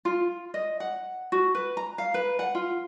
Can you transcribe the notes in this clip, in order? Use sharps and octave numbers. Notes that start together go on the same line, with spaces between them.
F4
D#5
F#5
F#4
B4
A#5
F5
B4
F#5
F4